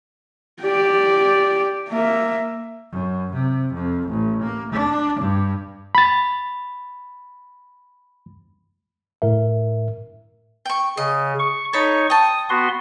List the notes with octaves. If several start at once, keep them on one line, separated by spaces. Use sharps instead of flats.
G4 D5
A#3 E5
F#2
C3
F2
A1
A#3
D4
G2
B5 A6
A2 A#4 E5
G5 C#6
C#3 D#5
C#6
D#4 A4 C#5 B5 C#6
G5 A5 D#6
B3 F#4 C6